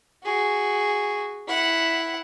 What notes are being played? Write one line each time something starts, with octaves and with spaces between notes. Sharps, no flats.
F#4 G#4
E4 F#5